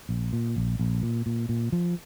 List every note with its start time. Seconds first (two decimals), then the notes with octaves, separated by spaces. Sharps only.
0.09 A#1
0.33 A#2
0.56 A#1
0.79 A#1
1.02 A#2
1.26 A#2
1.49 A#2
1.72 F3